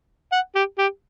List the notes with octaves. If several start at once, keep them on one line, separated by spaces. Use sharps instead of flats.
F#5
G4
G4